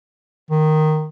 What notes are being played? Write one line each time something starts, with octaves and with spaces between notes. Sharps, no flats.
D#3